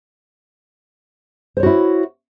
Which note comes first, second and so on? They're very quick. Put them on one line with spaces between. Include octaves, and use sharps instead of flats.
C5 C#5 F#4 E4